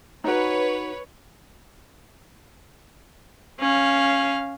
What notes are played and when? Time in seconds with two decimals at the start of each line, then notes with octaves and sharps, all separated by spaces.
0.24 D#4 F#4 B4 C#5
3.60 C#4 F5